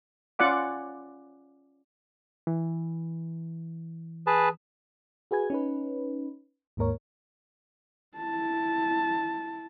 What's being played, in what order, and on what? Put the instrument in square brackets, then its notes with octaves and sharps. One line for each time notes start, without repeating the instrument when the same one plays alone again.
[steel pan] C#4 F4 D5 F#5 D6
[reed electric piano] E3
[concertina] G#4 B4 A5
[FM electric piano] F#4 G#4 B4 G#5 G#6
C#4 D#4 B4
D#2 G#2 A#3 A#4 C#5
[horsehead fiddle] E4 A5